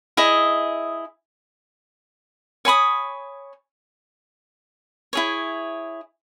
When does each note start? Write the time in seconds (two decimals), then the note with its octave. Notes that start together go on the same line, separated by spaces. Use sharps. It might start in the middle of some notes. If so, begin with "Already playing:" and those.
0.17 E4 G#4 D#5
2.65 C#5 G#5 B5 D#6
5.13 E4 G#4 C#5